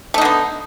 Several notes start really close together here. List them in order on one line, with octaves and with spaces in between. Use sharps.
A3 D#4 D3 B3